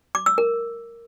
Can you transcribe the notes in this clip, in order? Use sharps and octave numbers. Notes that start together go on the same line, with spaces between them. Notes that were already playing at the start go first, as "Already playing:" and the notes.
D6
E6
A#4